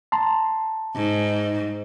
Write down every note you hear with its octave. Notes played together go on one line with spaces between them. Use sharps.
A5 A#5 C6
G#2